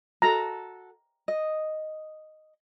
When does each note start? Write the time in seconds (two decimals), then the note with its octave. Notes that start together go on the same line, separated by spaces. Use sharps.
0.22 F#4 A4 A#5
1.28 D#5